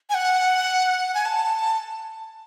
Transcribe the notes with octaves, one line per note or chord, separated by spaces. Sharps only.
G#5
F#5
G#5
A5